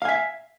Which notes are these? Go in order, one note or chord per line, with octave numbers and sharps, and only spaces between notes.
E5 F5 G#5